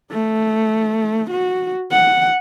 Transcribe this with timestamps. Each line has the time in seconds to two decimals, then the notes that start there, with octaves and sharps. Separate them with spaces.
0.11 A3
1.31 F#4
1.91 F#5